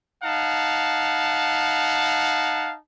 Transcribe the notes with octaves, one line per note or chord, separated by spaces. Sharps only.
D#4 F5 F#5 A5